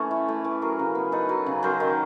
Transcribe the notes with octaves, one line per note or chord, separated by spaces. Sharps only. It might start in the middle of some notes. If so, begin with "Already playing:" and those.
Already playing: E3 A3 C#4
E4
A3
E3
F#3 G#4 A#4
C#3
B3
D#4 A4 B4
F#3
C#3
F#3 A#4 C5
D#3